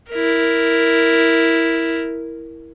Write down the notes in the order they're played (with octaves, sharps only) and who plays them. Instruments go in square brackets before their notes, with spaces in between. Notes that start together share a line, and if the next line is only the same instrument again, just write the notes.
[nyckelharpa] E4 A#4